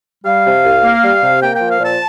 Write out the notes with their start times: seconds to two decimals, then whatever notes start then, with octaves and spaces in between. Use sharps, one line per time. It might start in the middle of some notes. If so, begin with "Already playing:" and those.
0.25 G3 F5
0.44 C3
0.64 C2
0.83 A#3
1.02 G3
1.22 C3
1.41 A#3 G5
1.55 G5
1.60 F3
1.69 F5
1.79 A#2 A5